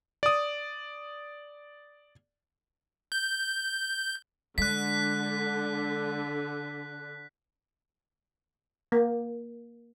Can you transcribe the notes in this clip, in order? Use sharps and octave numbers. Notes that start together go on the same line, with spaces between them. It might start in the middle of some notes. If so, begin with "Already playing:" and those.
D5 D#6
G6
D3 G#3 F#6 B6
A#3